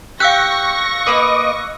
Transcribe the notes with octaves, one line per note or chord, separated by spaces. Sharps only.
G4 F5 C#6 E6 F#6 A#6
A#3 B4 D#5 D6 D#6